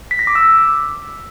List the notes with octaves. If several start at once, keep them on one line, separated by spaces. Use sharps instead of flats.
B6
A#6
D6
E6